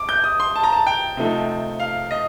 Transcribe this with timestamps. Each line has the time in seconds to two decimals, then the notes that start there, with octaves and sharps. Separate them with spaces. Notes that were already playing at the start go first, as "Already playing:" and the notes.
Already playing: D6
0.09 G6
0.24 D#6
0.40 C6
0.56 A5
0.64 A#5
0.73 A5
0.87 G5
1.17 C3 F3 A3 D#4
1.80 F5
2.11 D#5